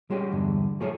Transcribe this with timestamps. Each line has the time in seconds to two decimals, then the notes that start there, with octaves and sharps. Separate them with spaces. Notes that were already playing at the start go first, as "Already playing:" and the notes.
0.10 G3 G#3 C#4 F#4 G4
0.31 E2 G2 D3
0.80 F#3 A3 F4 G#4 A4 C#5